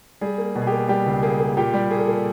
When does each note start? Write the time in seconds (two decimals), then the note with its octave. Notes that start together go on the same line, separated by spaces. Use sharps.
0.21 G3 G#4
0.38 A#3
0.55 B2
0.62 G#4
0.67 G4
0.72 A#3
0.89 G3 G4
1.06 C#2
1.22 A#3 G#4
1.40 A#3
1.52 G#4
1.57 A#2 G4
1.74 G3
1.91 A#3 G#4
1.99 A4
2.08 A#3 G#4